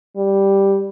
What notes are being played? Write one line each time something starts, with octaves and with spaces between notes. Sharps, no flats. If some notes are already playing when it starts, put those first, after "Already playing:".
G3